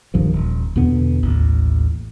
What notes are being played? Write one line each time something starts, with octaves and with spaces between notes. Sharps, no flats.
C#2 G2 D#3 F3
D#1
E2 B2 D3 B3
A1 D#2